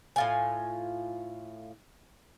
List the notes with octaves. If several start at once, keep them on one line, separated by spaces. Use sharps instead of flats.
A2 F4 G#5